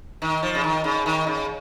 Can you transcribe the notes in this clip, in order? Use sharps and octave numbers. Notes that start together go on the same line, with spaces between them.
D#3
F3
C#3
D#3
C#3
D#3
C#3